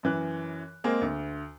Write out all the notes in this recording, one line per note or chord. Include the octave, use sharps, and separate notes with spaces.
F#2 E3 F#6
G#3 A#3 C4 G#4
D2